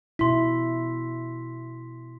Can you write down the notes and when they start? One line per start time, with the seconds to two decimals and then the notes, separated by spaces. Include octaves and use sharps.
0.19 B2 E4 C6 B6